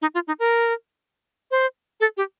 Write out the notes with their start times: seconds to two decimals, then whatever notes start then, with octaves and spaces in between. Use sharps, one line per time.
0.02 D#4
0.14 F4
0.27 D#4
0.39 A#4
1.51 C5
2.00 A4
2.17 G4